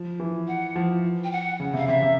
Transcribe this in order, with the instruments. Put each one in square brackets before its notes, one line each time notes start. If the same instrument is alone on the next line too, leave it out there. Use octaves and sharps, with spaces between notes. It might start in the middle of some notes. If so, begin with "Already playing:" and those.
Already playing: [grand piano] F3
E3
[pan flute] F#5
[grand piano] F3
[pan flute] G5
F#5
[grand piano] C#3
[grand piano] C3 [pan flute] F5
[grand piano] C3 [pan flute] E5
[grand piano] C3